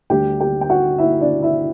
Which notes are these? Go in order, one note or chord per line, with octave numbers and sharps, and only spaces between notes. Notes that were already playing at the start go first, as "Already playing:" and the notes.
D2 D3 G3 G4 G5
G4 G5
G5
F#4 F#5
E4 E5
D4 D5
E4 E5